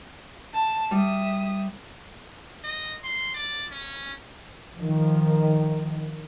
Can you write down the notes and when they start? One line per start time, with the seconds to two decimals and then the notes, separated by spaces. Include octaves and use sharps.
0.53 A5
0.91 G3 E5 D#6
2.64 D#5
3.04 C6
3.34 D5
3.72 C#4
4.78 D#3 F3